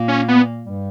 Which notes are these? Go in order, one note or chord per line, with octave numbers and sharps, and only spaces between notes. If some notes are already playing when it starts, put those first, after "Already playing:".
Already playing: A#2 A#3
C#4
B3
G2 G3